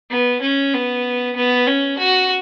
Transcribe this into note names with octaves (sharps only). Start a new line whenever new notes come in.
B3
C#4
B3
B3
C#4
F#4